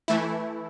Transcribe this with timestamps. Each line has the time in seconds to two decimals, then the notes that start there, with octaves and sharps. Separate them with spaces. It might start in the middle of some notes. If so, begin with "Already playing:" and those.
0.08 E3 A3 E4